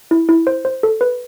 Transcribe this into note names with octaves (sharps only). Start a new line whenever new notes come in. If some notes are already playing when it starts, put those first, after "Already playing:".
E4
E4
C5
C5
A4
B4